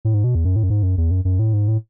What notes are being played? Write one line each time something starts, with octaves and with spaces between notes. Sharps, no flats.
A2
G#2
B2
E2
F#2
A2
F#2
G#2
F#2
E2
F#2
F#2
A2
G#2
A2